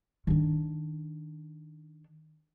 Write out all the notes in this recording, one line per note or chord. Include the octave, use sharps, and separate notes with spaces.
D#3 D4